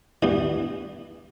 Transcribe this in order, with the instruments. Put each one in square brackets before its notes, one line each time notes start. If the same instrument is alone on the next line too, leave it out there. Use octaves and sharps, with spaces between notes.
[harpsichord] G2 E3 B3